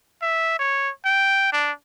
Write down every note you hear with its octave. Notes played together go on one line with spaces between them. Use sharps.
E5
C#5
G5
D4